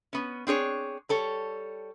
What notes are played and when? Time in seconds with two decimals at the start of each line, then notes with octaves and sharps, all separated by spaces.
0.13 B3 C#4
0.47 C4 D4 G#4 C#5
1.09 G3 A4 C#5